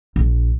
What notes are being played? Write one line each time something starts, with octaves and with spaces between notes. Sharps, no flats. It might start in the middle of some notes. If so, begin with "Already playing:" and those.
A#1